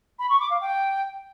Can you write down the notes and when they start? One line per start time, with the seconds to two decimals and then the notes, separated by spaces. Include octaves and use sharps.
0.19 B5
0.30 C#6
0.40 D6
0.50 F5
0.61 G5